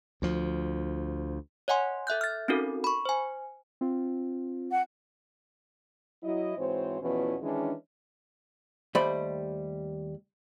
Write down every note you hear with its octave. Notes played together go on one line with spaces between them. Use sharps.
D2 F3
C#5 D#5 F#5 G#5 C6
A4 E5 F#6 G6
F6 A6
C4 C#4 D#4 F#4 A4 A#4
B5 C#6
C5 G#5
C4 F4
F#5
F#3 E4 D#5
G#2 E3 C4 F#4 C5 C#5
E2 B2 E3 F3 B3 C#4
D#3 E3 G#3 C#4 D4
D#2 G3 A3 C5 B5